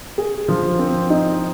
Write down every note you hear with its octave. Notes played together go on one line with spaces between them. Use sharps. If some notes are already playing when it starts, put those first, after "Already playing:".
G#4
F3
C4
D#4